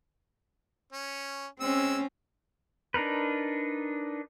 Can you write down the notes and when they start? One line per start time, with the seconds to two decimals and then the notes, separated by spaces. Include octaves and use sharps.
0.93 C#4
1.60 G#3 C4 C#4 E6
2.94 D4 D#4 A#4 B4